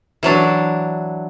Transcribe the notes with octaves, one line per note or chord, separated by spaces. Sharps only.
E3 F#3 D4